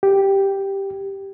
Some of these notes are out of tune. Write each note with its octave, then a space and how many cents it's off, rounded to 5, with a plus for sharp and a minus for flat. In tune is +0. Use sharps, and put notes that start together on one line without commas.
G4 +0